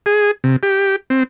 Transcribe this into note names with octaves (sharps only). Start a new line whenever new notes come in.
G#4
C3
G4
C4